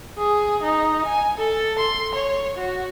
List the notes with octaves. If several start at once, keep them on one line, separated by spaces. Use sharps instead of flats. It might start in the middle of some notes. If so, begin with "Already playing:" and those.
G#4
D#4
G#5
A4
C6
C#5
F#4